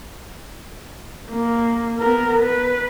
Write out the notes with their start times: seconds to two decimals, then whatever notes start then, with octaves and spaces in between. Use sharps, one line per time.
1.32 A#3
1.99 B3 A#4
2.43 B4